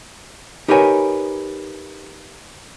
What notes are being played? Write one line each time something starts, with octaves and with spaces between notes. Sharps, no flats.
D#4 G4 A#4 B4 C#5 G#5